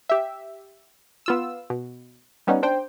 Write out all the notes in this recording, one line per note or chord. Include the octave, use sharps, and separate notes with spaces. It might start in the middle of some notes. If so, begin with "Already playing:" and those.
G4 E5
B3 F4 E6
B2
G3 B3 C#4 D#4
D4 C5 G5